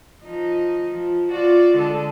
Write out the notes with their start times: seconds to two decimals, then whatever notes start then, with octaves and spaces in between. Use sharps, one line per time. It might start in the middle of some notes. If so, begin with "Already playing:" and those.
0.24 F3 D#4
0.89 F3
1.31 F4 F#4 D5
1.76 D3 G#3 A4